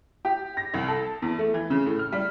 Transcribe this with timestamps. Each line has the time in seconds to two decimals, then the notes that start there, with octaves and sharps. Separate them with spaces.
0.25 G4
0.57 A#6
0.74 C2
0.88 A4
1.22 E2
1.39 A3
1.54 E3
1.70 C#3
1.86 A2
1.99 F6
2.12 G3